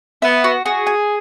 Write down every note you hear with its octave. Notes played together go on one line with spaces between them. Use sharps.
B3 E5
F#4
F#4 G#4
G#5